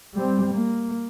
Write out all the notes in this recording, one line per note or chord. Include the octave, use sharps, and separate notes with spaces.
G3 C4
A#3